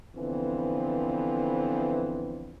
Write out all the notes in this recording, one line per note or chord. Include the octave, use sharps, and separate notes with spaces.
D3 E3 F3 B3 C4